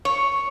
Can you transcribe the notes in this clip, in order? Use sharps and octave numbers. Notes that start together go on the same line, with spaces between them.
C#5